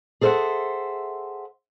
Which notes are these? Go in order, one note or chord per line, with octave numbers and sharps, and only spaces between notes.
G#4 A4 C5 D#5 E5 F#5